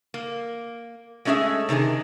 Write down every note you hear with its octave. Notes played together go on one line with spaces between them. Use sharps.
A#3
G#3 A3 C#4 G4 G#4 E5
C3 D#3 D4 G#4